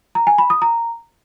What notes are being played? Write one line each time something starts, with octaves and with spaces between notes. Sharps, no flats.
A#5
G#5
B5
D#6
A#5